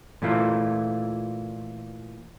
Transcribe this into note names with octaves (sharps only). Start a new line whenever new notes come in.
A#2 E3 A3 F4